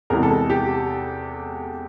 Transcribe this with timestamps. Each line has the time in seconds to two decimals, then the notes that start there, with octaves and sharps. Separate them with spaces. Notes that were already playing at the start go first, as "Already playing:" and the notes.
0.10 E2 C3 E3 G#3 A#4
0.23 A4
0.50 G4